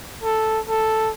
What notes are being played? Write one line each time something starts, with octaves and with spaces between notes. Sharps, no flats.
A4
A4